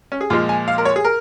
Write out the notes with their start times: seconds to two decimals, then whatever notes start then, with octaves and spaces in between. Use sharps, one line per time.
0.12 C#4
0.21 G#4
0.30 A#2 F3 G#3 F4
0.49 G#5
0.68 F5
0.78 A#4
0.85 C#5
0.96 G#4
1.05 A#4